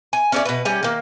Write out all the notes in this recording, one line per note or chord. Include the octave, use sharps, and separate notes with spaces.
G#5
C#4 D4 D5
B2 B4
G3 C#4 G#5
D#3 A#3